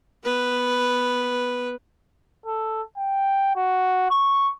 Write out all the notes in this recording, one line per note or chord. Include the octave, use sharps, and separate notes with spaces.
B3 B4
A4
G5
F#4
C#6